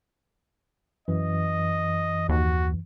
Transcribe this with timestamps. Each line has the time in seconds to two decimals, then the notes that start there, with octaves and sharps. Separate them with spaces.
1.08 F#2 E3 D#5
2.29 D#2 F#4